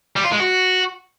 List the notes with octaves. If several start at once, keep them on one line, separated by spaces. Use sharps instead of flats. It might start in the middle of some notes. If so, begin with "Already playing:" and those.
G3
F4
G#3
F#4